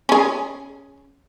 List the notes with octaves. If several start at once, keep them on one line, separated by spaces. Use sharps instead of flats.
C#4 G#4